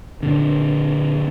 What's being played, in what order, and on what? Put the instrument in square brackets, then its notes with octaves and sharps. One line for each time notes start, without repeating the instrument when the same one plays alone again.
[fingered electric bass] A#2 D3